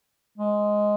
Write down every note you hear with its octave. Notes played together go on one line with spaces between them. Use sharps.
G#3